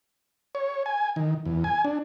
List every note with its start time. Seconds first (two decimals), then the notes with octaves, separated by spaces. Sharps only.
0.55 C#5
0.86 G#5
1.16 D#3
1.46 E2
1.64 G#5
1.85 D4